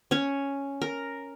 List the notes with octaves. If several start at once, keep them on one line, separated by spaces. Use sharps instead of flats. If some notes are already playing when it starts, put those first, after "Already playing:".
C#4 C#5
A#4